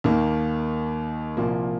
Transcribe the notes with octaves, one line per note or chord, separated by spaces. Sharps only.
D#2 D#3 A#3
C2 A#2 F3 A#3